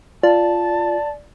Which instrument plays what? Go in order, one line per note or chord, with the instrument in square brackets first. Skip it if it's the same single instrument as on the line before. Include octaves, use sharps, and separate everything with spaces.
[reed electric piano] F4 [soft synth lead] D5 [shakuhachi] A5